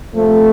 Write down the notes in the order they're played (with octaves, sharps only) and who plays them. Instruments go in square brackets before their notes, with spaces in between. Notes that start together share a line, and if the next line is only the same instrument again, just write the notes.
[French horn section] C3 F3 A3